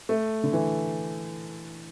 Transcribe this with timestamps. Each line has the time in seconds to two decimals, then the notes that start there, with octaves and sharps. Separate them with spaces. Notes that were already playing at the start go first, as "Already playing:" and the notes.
0.09 A3
0.44 D3
0.53 E3